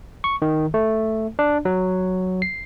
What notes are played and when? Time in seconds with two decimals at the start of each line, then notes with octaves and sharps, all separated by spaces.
0.24 C#6
0.42 D#3
0.74 A3
1.39 D4
1.65 F#3
2.42 C7